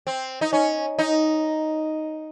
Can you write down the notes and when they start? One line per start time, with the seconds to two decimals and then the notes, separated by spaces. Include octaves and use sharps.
0.07 C4
0.41 D#4
0.53 C#4
0.99 D#4